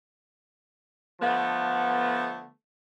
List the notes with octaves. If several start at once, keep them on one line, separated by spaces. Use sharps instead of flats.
D3 F3 A3 B3